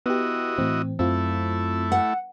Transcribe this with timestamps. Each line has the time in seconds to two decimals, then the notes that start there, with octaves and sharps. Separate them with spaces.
0.06 B3 E4 F#4 G4 D#5
0.58 A2 E3 C4
0.99 F#2 A3 C4 E4 F4
1.92 F#5